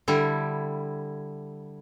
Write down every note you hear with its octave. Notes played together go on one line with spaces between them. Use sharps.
D3 G3 E4